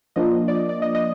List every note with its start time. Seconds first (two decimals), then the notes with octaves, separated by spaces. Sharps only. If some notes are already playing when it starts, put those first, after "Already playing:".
0.16 F3 A#3 D4 F4 D#5
0.48 D5
0.55 D#5
0.69 D5
0.82 D#5
0.95 D#5